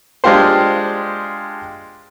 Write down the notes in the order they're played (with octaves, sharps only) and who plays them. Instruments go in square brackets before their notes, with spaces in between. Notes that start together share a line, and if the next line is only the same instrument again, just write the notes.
[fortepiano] G#3 D4 F4 G4 C5